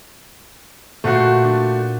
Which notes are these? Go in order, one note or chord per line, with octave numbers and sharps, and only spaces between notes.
A#2 A3 F#4 C5 F#5
D4